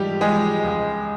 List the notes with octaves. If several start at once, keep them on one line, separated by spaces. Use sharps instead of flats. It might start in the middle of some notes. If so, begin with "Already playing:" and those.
Already playing: G#2 F3 G3 G4
F3 G#3 G#4
C#2